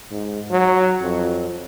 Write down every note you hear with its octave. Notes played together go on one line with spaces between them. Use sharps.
G#2
F#3
F2